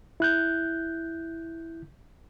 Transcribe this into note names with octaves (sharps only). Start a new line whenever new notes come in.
E4 F#6 G6